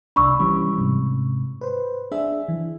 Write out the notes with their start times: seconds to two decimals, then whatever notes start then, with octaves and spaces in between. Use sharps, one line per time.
0.16 C2 D4 B5 C#6 E6
0.39 E3 G3 C#4
0.78 G#2 C3
1.61 B4 C5
2.12 D4 G#4 E5
2.48 E3